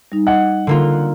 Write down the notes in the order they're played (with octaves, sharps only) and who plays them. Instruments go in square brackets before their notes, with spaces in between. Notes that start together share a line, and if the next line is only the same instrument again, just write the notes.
[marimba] G3 D#4
[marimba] D#5 [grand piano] F#5
[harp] D3 A#3 F4